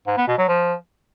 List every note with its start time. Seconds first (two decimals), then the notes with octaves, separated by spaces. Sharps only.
0.07 G#2
0.17 B3
0.28 B2
0.38 F#3
0.48 F3